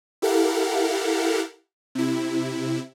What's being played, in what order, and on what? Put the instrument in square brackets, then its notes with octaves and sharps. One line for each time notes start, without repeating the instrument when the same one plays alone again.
[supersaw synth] E4 G4 A4 A#4 F5 F#5
C3 E4